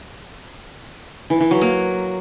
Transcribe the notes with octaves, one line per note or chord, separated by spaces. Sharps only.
E3
E3
F#3
A#3